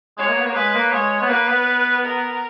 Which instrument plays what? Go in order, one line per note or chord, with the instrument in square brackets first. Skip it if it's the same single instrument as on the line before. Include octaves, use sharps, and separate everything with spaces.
[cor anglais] G#3 [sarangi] C#5
[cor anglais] A#3
B3
A#3
[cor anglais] G#3 [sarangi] B4
[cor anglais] A#3
[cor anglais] G#3 [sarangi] C#5
[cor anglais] B3
[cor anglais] A#3 [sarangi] B4
[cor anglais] B3
[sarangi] A#4